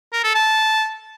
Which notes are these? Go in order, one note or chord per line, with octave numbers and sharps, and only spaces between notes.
A#4
A4
A5